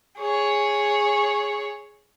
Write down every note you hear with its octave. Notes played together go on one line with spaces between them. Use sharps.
G#4 C#5